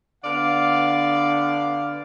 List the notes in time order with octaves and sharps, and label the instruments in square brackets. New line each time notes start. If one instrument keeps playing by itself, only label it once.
[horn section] D3 B3 D5 F5